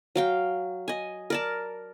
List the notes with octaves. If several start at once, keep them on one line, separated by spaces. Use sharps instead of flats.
F#3 F5 G5
D#5 G#5
A#4 D5 A5